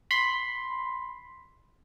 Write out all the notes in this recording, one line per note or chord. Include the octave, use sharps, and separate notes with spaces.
B5 C6